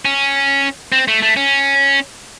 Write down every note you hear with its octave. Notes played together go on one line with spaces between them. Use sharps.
C#4
C4
A3
A3
C#4